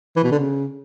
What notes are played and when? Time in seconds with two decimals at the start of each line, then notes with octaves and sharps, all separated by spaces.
0.16 E3
0.24 B2
0.31 D3
0.39 C#3